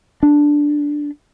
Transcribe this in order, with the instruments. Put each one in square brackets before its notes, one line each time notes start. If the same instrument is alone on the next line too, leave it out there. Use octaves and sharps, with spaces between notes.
[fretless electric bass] D4